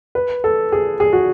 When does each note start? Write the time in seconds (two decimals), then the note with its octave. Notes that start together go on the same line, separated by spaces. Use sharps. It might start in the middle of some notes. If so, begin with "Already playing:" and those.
0.15 B4
0.44 A4
0.72 G#4
1.00 G#4
1.13 F#4